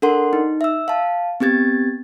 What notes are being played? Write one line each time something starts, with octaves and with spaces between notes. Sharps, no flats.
D4 A4 A#4 F#5 C6
D#4
E5 E6
F5 A5
B3 C4 G4 G#6 A6